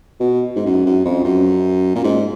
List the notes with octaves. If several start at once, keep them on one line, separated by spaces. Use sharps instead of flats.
B2
G#2
F#2
F#2
F2
F#2
A#2
G#2